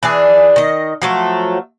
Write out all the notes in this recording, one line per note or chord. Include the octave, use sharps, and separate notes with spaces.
E3 D4 G#4
D#3 D#5
F3 F#3 A3